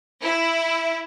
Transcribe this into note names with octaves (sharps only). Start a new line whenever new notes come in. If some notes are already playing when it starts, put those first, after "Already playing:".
E4